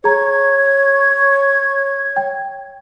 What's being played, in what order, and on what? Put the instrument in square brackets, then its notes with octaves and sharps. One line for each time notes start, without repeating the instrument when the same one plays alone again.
[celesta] G#4 A#5 [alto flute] C#5 [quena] G#6
[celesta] G5